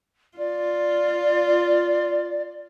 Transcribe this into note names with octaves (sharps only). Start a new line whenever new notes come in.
F4 D5